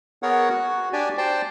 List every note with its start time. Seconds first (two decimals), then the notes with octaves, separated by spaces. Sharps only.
0.23 B3 G#4 A#4 C#5 F#5
0.49 F#4
0.93 D4 G4 D5 G#5
1.18 C5 D5 G5 A5